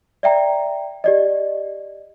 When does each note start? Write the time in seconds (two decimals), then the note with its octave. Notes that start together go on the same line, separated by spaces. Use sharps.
0.23 D5 E5 G5 A#5
1.04 G4 D5 D#5